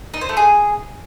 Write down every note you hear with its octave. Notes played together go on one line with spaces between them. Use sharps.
D#4
C5
A3
G#4